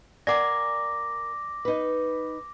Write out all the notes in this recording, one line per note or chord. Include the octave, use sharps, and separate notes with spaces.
A#4 D5 F#5 G#5 D6 A#6
D#4 B4